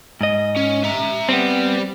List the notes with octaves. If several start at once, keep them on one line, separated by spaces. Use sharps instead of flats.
G#2 D#5
C#4
E5 A#5
G3 B3 C4